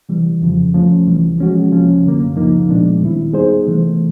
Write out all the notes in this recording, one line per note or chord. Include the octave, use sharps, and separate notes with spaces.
C3 E3 G3
F2 C#3 F3
F3 A3 C#4
C2 C3 E3 G3
F3 G#3 C#4 F#4
C2 C3 F3 A#3 C#4
F#2 D3 F#3 A#3
C#2 C#3 F3 A#3 D#4
A#2 F3 G#3 B3 D4
D#2 D#3 G3 C4 E4
G3 B3 D#4 G#4 C5
C3 E3 A3